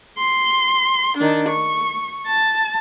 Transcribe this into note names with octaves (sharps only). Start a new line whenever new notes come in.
C6
D#3 D4
C#6
A5